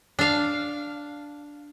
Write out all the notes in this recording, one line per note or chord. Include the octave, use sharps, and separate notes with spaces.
D4 F5